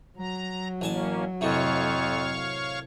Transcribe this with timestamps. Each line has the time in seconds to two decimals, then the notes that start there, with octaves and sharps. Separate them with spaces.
0.17 F#3 A#5
0.81 A1 A#3 C#4 G#5 A5
1.41 F2 A2 C3 D#3 C#5 F5 C#6